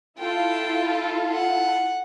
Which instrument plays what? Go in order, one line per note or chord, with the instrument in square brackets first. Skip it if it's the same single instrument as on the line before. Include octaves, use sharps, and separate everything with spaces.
[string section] E4 F4 A4 [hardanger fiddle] G5
[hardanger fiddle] F#5